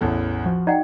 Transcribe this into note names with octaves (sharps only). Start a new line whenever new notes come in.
A1 E2 A4
F3 F#4
D#4 D5 F#5 G5